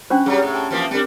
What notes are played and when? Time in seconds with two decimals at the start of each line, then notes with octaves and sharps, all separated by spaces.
0.10 C#4 D4 C5 B5 C#6 F#6
0.26 F#3 G3 G#4 F#5 A#5
0.43 A2
0.54 G5 A5
0.70 E3 F3 A#3
0.91 G3 C4 D4 A#4